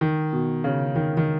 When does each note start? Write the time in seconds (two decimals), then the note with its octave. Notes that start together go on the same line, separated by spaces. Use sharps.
0.01 D#3
0.33 B2
0.64 C#3
0.96 D#3
1.17 D#3